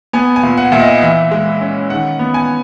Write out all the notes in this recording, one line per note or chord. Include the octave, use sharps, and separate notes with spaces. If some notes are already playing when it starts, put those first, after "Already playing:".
B3 G#5
G#5
A#2
F#5
A#2 E5
D#5
E3 E5
G#3
C#4
D#3 F#5
B3
G#5